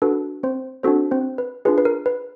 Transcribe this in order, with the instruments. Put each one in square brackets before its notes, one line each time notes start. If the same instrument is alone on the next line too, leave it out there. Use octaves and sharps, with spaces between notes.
[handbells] D4 F#4 A4 B4
C4 C5
C4 D4 F#4 A4 C5
C4 C5
B4
D4 F4 G#4 B4
B4
A#4
B4